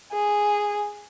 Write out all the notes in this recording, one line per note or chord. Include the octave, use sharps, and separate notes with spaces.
G#4